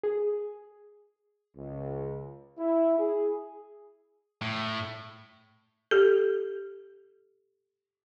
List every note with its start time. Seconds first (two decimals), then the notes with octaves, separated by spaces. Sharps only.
0.03 G#4
1.57 C#2
2.58 E4
2.99 G#4
4.42 A2
5.91 G4 A4